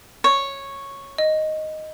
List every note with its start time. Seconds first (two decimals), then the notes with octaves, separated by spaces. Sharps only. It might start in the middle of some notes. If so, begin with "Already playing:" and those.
0.24 C#5
1.18 D#5